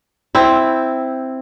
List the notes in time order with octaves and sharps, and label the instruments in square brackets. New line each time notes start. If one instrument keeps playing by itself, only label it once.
[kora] C4 E4